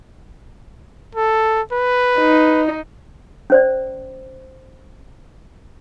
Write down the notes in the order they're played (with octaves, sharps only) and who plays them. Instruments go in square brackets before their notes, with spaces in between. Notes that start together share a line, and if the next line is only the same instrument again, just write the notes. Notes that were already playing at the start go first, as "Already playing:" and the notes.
[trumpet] A4
B4
[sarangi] D#4
[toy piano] C#4 C5 D5